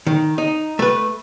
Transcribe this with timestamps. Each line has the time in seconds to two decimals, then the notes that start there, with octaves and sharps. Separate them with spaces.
0.07 D#3
0.38 D#4
0.79 A3 B4